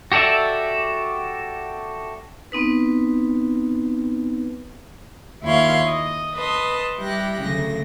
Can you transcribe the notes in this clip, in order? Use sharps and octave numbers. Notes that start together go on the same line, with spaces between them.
F#4 G4 A4 D5 E5
B3 C4 D#4 B4
D#2 E4 F4 C#5 F5 C6
D#5
B4 D#5 A5 C6
G3 E4 G4 F#6 A#6
D2 C#3 F#3 A#6